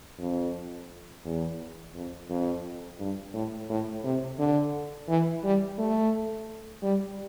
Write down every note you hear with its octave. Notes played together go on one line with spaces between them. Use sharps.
F2
E2
F2
F2
G2
A2
A2
C3
D3
E3
G3
A3
G3